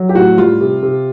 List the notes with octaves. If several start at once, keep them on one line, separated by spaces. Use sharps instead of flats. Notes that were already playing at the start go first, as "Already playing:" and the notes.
Already playing: F#3
G4
A2 F#4
G3 F4
C3
C3